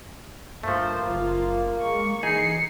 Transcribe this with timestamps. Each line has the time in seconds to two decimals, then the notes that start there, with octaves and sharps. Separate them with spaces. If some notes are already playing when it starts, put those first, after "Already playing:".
0.63 G2 F3 A3 A#3 C5
1.05 F#1 F4
1.81 G#3 C#6
2.23 E3 D#4 G#4 C7 C#7